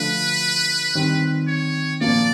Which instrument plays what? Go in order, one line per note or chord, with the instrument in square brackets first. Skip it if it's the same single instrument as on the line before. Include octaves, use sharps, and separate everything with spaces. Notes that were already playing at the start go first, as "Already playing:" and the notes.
Already playing: [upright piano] D3 F3 A3 [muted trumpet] B4
[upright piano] D#3 G3 C4
[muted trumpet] C#5
[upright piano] A#2 F3 A#3 [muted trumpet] D5